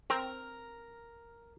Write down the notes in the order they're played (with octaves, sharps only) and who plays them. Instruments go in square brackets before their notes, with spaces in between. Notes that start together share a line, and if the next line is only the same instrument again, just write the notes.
[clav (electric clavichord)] C4 [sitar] A#4